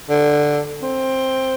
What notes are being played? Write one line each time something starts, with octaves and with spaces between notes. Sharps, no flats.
D3
C4